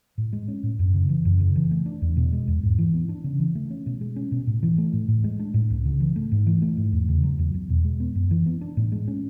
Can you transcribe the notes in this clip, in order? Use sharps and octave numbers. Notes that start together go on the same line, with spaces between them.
A2
G#3
C#4
A2
F#2
C#3
E3
F#2
C#3
E3
A3
D4
E2
B2
G#3
E2
G#2
E3
B3
D4
C#3
E3
A3
C#4
B2
G#3
C#4
B2
A2
E3
A3
A2
A2
G#3
D4
A2
C#2
C#3
E3
A3
G#2
E3
A3
G#2
E2
C#3
F#3
E2
E2
B2
G#3
B3
F#2
E3
B3
D4
A2
G#3
C#4